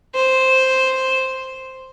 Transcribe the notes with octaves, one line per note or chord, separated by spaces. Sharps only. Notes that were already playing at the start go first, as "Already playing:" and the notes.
C5